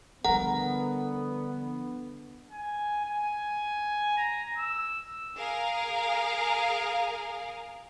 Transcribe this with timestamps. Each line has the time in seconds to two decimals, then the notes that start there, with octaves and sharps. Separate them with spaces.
0.25 D3 F3 G3 B3 A#4 F#5
2.52 G#5
3.05 G#5
4.17 A#5
4.58 E6
5.37 G#4 A#4 F5